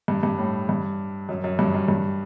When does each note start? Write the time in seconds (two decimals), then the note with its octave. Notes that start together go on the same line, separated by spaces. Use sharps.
0.08 G2
0.23 G2
0.38 A2
0.69 G2
1.29 F#2
1.44 F#2
1.59 G2
1.74 F#2
1.88 G2